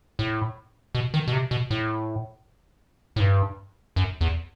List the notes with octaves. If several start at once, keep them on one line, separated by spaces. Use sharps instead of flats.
A2
B2
D#3
B2
C3
B2
A2
A2
G2
F#2
E2